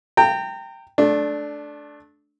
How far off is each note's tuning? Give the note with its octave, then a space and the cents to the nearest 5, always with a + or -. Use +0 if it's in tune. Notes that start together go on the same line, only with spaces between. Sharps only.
G5 +0 A#5 -35
A3 -25 D4 +0